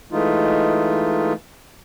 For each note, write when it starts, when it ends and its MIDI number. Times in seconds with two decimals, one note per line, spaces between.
0.12 1.33 52
0.12 1.33 56
0.12 1.33 57
0.12 1.33 63
0.12 1.33 65